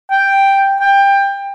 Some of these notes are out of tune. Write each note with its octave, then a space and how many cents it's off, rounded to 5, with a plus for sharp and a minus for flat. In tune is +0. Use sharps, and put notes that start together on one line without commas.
G5 +0
G5 +20